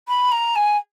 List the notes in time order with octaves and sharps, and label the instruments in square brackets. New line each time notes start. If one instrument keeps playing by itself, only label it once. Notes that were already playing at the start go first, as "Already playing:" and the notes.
[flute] B5
A#5
G#5